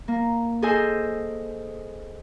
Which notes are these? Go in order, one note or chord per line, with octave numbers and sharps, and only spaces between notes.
A#3
G#4 A4 C5 D#5 G#5